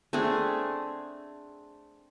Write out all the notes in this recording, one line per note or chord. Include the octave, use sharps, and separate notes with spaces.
A3 C4 D4 G#4